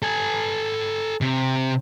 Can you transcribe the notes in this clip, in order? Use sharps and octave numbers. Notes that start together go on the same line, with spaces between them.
A4 G#5
C3